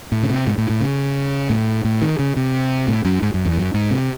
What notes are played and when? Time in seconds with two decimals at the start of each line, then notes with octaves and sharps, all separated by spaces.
0.12 A2
0.23 C#3
0.30 C3
0.47 G#2
0.58 A2
0.70 A2
0.80 C#3
1.50 A2
1.85 A2
2.02 D#3
2.19 C#3
2.37 C3
2.88 A2
3.05 F#2
3.22 G#2
3.34 F#2
3.45 E2
3.57 F#2
3.74 G#2
3.91 C3